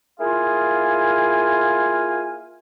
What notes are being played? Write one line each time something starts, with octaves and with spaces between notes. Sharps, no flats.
A#3 E4 F4 G#4 F5 G#5